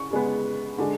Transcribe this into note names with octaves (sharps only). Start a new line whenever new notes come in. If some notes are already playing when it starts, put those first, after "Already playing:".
Already playing: C#3 C#6
C#3 G#3 B3
D3 G#3